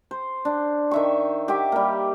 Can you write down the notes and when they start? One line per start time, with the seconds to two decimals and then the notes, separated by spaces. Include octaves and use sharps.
0.11 C5
0.45 D4
0.91 D#3 E5 C#6
1.48 G4 E5 F#5 D6
1.72 G3 A#3